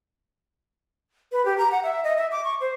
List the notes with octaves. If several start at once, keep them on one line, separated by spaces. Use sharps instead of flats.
B4
G4
A#5
F#5
E5
D#5
E5
D6
C#6
C5